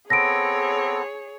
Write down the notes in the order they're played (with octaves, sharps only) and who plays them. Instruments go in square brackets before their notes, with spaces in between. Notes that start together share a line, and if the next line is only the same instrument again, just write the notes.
[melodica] B3 C4 A4 [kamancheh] G#4 C#5 [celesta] A#6 D7